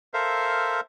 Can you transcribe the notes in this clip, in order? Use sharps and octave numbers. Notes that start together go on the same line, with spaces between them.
A4 A#4 C5 E5 F5